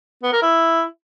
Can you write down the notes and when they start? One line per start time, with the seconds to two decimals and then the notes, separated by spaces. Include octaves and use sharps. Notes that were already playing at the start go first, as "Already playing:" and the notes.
0.23 B3
0.32 A#4
0.42 E4